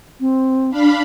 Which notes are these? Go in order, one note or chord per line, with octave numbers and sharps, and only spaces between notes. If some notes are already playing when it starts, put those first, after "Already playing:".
C4
D4 F5 B5